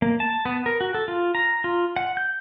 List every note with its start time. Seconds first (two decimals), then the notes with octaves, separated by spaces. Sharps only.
0.02 A#3
0.20 A5
0.45 B3
0.66 A#4
0.81 F#4
0.94 A4
1.08 F4
1.35 A#5
1.64 F4
1.96 F#5
2.17 G6